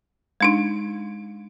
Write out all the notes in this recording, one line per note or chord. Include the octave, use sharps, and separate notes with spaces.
G#3 D4 D#4